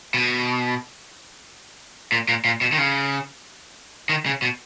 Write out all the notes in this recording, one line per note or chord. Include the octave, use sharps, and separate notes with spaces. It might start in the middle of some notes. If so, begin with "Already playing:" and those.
B2
A#2
A#2
A#2
B2
D#3
C#3
D#3
C#3
B2